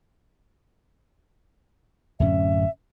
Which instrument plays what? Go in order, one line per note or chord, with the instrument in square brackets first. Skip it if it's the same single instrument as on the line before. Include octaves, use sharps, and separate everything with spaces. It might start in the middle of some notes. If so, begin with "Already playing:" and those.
[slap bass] D1 F#2 C#4 [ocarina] E5